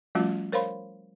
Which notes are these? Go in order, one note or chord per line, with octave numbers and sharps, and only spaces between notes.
F3 G3 A3 C#4 F4 F#4
A#4 C5 C#5 F5 B5 C6